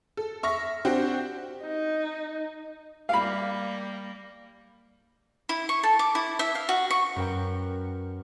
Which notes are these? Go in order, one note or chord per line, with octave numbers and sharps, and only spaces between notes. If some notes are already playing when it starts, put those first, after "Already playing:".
A4
E5 C#6 F6 A#6
C4 D4 F#4 G4 C5
D#4
G3 A#3 F5 B5
E4
C#6
A4
D6
E4
E5
F5
F#4
C#6
F#2 F#4 A#4 B4 G5